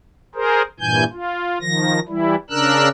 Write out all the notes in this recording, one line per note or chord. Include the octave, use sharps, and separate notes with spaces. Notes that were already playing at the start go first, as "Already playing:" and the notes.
G#4 A#4 C5
G2 A#2 E3 G#5 G6
F4
D#3 F3 A#6
E3 G3 E4
C#3 D4 A#4 E6 F#6